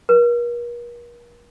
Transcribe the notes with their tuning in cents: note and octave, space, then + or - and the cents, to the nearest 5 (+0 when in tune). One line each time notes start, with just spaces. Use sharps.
A#4 +45